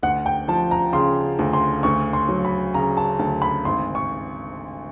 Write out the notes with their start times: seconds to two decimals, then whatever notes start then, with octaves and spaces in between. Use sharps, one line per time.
0.03 D2 F#5
0.26 G5
0.48 F3 A5
0.71 A#5
0.93 C#3 C6
1.39 D2
1.53 C6
1.83 D2 C#6
2.13 C6
2.29 F#3
2.45 B5
2.74 C#3 A#5
2.97 A5
3.19 D2 A5
3.42 B5
3.65 G#1 C6
3.95 C#6